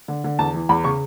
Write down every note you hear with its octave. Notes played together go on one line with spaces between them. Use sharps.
D3
D3
E2 A5
E3
E2 B5
C#3 C#6